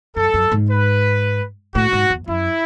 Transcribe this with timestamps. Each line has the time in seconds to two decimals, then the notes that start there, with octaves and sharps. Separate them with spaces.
0.16 F#2 A4
0.34 F#2
0.52 G#2
0.70 B4
1.75 A2 F#4
1.93 G#2
2.10 E2
2.28 F#2 E4